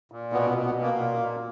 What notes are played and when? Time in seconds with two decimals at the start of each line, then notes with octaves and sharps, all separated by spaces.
0.12 A#2
0.33 B2 B3
0.49 B3
0.54 B2
0.65 B3
0.76 B2
0.81 A#3
0.97 A#2
1.18 A#2